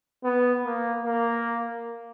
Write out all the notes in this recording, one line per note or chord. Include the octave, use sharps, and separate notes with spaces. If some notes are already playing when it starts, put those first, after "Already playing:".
B3
A#3
A#3